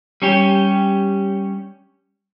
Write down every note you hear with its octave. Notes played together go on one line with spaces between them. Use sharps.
G3 C#4 G4